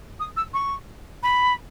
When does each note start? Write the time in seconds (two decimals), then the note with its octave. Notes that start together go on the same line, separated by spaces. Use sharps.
0.19 D#6
0.36 E6
0.53 C#6
1.23 B5